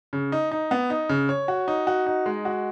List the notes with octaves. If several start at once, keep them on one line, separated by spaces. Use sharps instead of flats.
C#3
D#4
D#4
B3
D#4
C#3
C#5
F#4
D#4
F#4
D#4
G#3
F#4